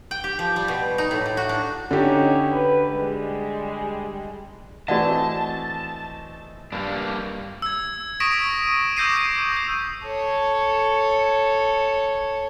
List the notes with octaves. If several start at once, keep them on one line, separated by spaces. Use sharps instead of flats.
G5
G4
F3
G3
B2
D#4
A2
A2
F#4
D4
D3 C#4 D#4 G4 C#5
D2 B4
G3 G#3
E3 A3 C4 F#4 D5 D#5 F#5 A5
G2 G3 A#3 D4
E6 G#6
C#6 D#6 A#6 B6 D7 E7
D#7
D6 E6 G6 A#6 C7 D#7
G6 A#6 D#7
D#6 G6
A4 C#5